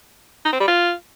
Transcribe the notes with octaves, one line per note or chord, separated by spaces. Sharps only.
D#4
C4
G3
F4